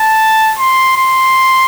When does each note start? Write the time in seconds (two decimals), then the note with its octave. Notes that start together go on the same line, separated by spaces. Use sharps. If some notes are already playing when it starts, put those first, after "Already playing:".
Already playing: A5
0.59 C6
0.97 C6